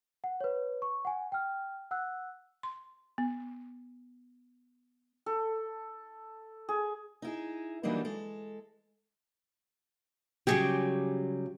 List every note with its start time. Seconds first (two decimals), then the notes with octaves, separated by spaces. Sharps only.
0.24 F#5
0.41 B4 C#5
0.82 C#6
1.05 F#5 G#5
1.32 G5 F6
1.91 F#5 E6 F#6
2.63 C6
3.18 B3
5.26 A4
6.69 G#4
7.22 D#4 E4 G#4
7.83 E3 F#3 G3 A#3 D4 D#4
8.05 G#3 A4
10.47 C#3 F#3 G3 G4 G#4 C#6